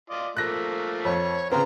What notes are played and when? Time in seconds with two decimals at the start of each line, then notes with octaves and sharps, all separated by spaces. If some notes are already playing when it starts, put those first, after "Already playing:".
0.10 F4 D5 D#5
0.37 F3 A3 A#3 F#6 A#6
1.05 F2 C#5
1.52 C#3 B3 C4 F4 A#5